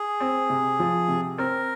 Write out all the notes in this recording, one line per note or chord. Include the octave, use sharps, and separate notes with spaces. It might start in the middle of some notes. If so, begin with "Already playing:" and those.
Already playing: G#4
C4
C3
F3
C3
C4 A#4